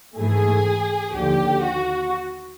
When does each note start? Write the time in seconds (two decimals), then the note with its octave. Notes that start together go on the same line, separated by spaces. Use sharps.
0.17 G#2 E3 A3 G#4
1.14 D#2 D3 F3 G4
1.61 F#4